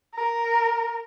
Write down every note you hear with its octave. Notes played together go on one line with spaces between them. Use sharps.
A#4